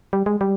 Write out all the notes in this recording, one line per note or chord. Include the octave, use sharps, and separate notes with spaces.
G3
G#3
G3